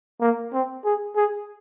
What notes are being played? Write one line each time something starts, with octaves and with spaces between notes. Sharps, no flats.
A#3
C4
G#4
G#4